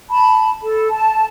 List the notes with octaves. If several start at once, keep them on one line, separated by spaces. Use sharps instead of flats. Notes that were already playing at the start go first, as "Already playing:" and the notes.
A5 B5
A4
A5